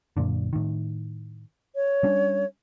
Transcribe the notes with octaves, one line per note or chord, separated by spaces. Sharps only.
F#2 A#2 D3
A2 D#3
C#5
G3 C#4 D4